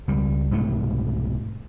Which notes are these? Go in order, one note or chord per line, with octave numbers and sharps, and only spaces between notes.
C#2 G3
C2 G#2 B2 A3